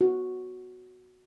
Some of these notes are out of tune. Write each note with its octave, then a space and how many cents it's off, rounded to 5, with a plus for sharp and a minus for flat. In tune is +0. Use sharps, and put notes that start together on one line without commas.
F#4 -5